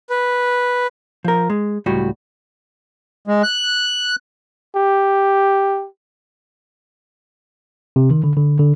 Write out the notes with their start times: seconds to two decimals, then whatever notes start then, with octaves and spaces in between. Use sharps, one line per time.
0.10 B4
1.25 F3 A#4
1.50 G#3
1.86 C#2 A2 G3 F#4
3.27 G#3
3.43 F#6
4.76 G4
7.96 C3
8.11 D#3
8.24 D3
8.37 D3
8.60 D3